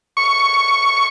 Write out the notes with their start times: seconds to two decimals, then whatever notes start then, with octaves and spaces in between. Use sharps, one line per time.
0.17 C#6